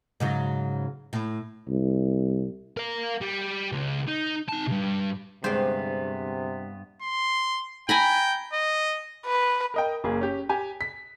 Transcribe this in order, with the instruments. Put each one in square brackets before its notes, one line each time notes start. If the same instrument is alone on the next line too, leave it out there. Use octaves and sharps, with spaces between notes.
[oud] G#2 C#3 F#3
A2
[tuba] C2
[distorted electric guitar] A#4 F5
G3
C#2 C#3
D#4
D#4 A5
G2 C3
[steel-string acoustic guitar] D2 G#3 B4 [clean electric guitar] G2 B3 [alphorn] C3 [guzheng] C5 G5
[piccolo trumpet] C6
[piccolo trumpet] G5 [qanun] G#5 A#5 B5
[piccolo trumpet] D#5
[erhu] B4
[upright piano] A#4 D#5 G5
F#1 A#3 G#4
C#4 G4
G4 G#5
B6